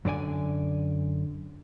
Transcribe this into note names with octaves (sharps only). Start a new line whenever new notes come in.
F#2 D3 D5 G#5